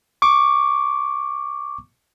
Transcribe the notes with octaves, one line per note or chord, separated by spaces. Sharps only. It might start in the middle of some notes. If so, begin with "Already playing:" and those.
C#6 D6